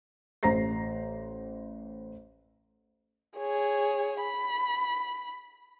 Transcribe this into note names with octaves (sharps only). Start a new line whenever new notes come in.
A1 C5 A#5 A#6 C7
G#4 C#5
B5